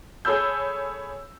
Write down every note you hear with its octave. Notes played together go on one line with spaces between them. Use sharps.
G#4 A4 C#5 B5 E6 G6